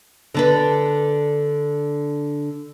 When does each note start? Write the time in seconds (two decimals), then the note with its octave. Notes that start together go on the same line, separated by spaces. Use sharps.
0.34 D3 D4 B4